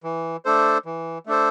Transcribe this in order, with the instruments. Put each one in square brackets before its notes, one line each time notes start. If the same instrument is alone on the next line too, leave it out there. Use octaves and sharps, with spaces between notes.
[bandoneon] E3
A3 D4 A4 C5
E3
A3 D4 A4 C5